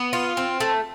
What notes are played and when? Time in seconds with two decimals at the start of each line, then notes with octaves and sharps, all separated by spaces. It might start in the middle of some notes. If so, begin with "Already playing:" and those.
Already playing: B3
0.13 F4
0.37 C4
0.60 A3